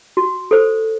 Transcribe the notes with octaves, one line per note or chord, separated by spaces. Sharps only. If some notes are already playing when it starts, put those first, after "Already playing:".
F#4
A4 C5